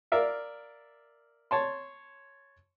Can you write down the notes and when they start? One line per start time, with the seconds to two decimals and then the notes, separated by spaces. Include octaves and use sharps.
0.12 A#4 D5 E5 F5
1.51 C#5 A5 C6